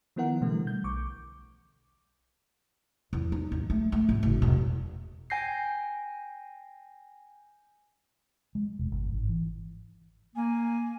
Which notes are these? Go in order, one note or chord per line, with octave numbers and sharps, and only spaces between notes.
D#3 F3 B3 E4 A#4 F#5
B2 D3 E3 G3 A3
G6
B1 C#6 D6
E2
D#4
D#2
A3
A3
A1
F#1
E1
G5 G#5 G6 A#6 C7
G#3
E1
G1
G#1
E3
A#3 G#5